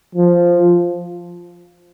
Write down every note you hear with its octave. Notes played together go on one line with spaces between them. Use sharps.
F3